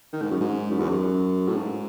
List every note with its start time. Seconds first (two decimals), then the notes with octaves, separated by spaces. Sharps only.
0.13 D#3
0.22 G#2
0.31 F#2
0.41 G#2
0.70 F#2
0.80 E2
0.89 F#2
1.48 A2
1.57 G#2